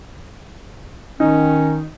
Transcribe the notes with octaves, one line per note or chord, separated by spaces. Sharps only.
D#3 C#4 D#4